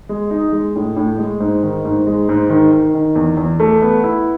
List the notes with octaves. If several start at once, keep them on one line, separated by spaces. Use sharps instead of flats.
G#3
D#4
G#3
A2
A2
G#3
G#2
D#3
G#2
G#3
G#2
D#3
D#3
D#3
E2
E2
A3
B3
E4